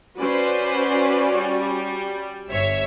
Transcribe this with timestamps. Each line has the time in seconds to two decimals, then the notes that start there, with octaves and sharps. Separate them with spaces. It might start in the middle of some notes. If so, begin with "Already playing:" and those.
0.18 C#4 F#4 B4 C5 D5
1.35 G3
2.49 G1 C#5 E5